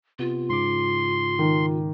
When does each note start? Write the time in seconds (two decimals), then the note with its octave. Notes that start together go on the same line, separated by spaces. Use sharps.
0.19 C3 B3 F4
0.50 G#2 C#3 C6 D6
1.39 D#3